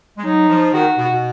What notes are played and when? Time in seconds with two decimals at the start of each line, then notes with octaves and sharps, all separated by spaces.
0.17 G#3
0.24 F#3 D#4
0.49 F3
0.73 D#3 F#4
0.98 B2
1.10 B2